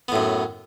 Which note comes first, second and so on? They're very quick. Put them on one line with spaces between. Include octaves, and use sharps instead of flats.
B3 A2 F#2